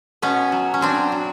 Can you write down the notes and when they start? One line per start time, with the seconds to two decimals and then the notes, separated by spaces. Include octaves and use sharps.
0.22 B2 B3 C#4
0.52 F#3
0.74 C#4
0.81 F#3 C4 D4
1.12 F#3